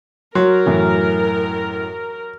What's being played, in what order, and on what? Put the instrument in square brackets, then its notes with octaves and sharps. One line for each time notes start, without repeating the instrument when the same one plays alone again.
[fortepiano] F#3 [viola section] A#4 [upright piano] C6
[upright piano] F#2 A2 E3